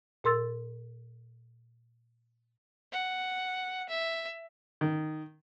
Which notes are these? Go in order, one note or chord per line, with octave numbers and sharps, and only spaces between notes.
A#2 A#4 C6 E6 A6
F#5
E5
D#3